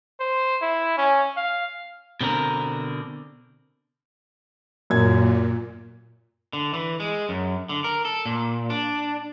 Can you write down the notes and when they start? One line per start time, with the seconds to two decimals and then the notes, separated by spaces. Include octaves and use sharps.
0.20 C5
0.62 E4
0.98 C#4
1.37 F5
2.21 B2 D3 C4 A#4
4.90 F#2 A#2 G#6
6.53 D3
6.74 E3
7.00 G#3
7.29 F#2
7.69 D3
7.84 A#4
8.05 A4
8.26 A#2
8.70 D4